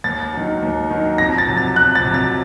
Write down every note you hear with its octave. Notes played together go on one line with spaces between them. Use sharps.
D#2 A6
D#3 F#3
D#2
D#3 F#3
F2 A#6
A6
C3 F#3
A6
F2 F#6
A6
C3 F#3
A6